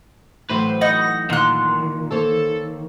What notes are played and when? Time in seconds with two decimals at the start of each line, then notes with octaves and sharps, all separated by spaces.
0.50 A2 E3 F#3 B4 C5
0.81 D#4 F#4 A#6
1.30 A#2 D#3 C6 F#6
2.11 A#3 A4 C5 C#5